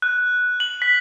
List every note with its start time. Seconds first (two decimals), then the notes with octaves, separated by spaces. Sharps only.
0.02 F#6
0.60 F#7
0.82 B6